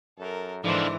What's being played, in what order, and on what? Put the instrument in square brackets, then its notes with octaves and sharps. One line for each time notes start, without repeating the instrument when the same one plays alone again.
[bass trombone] F#2 [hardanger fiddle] A4 A#4
[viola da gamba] G#2 E3 [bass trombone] D3 [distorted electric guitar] F3 E4 [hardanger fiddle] D4 C5